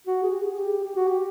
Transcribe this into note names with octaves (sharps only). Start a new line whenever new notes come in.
F#4
G#4
G4
G#4
G4
G4
F#4
G4